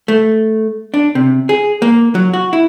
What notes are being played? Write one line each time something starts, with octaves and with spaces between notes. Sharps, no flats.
A3
D4
C3
G#4
A#3
F#3
F#4
E4